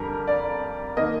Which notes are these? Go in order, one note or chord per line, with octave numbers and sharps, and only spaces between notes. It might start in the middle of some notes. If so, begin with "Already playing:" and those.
Already playing: F2 D3 G3 A#4
D5
D#3 A#3 D#5